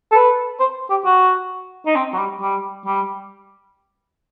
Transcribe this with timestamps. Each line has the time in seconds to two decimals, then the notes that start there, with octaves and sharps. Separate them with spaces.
0.12 A4
0.15 B4
0.60 C5
0.90 G4
1.05 F#4
1.86 D#4
1.96 C4
2.14 F#3
2.18 G3
2.41 G3
2.86 G3